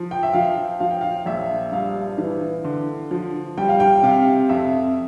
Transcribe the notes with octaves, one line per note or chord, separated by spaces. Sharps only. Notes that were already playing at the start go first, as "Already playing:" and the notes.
Already playing: F3
G5
E5
F3 F5
F3 F5
G5
F5
A#1 E5
G2 F5
E3
D3
F3
G3 G5
F5
G5
C3 F5
F2 E5